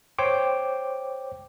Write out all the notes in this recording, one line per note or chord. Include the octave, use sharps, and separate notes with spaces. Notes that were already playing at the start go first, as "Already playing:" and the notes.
C5 C#5 G5 D6